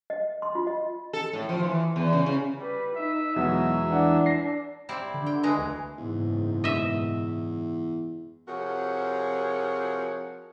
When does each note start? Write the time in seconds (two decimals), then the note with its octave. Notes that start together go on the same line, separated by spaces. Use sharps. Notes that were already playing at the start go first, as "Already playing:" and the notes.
0.10 D#5
0.42 C6
0.55 F4
0.67 D#5
1.13 A4
1.33 A2
1.49 F3
1.63 E3
1.96 E2
2.13 C#3
2.26 C#3
2.60 G3 B4
2.96 D#4 E5
3.36 E2 B2 F#3 G#3 E5 F#5 A#5
3.90 E3 D4 F#5
4.26 A#6 C7
4.89 G3 C4 E4
5.14 D3
5.26 G5
5.43 E3 G#3 A#5
5.58 D2
5.98 F#1 E2 G#2 B2
6.64 D#5 E5
8.48 C3 F3 F#4 G#4 A#4 C#5